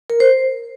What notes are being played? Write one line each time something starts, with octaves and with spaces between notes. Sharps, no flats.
A#4
C5